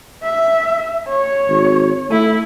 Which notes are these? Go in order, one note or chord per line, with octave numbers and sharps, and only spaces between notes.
E5
C#5
G#1
A3 E4